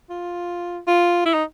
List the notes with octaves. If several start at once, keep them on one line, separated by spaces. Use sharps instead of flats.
F4
F4
E4
D#4